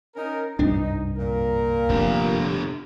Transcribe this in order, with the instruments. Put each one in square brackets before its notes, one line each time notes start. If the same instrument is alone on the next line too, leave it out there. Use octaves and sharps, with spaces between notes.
[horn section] C#4 D#4 A#4
[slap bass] C2 D4 [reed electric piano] G2 [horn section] D#4
[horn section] A#2 A#4
[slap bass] F1 [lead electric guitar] D3 G4